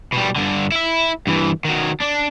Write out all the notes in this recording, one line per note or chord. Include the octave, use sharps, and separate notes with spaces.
B2 G3
G2 D3
E4 E5
G2 E3
D#3 F#3
D4